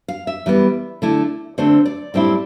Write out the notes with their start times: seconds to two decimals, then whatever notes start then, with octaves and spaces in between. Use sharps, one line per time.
0.08 F5
0.27 E5
0.46 E3 G3 B3
1.02 D3 A3 E4
1.58 D3 A3 C4 C5
1.86 D5
2.14 A2 G3 C4 E4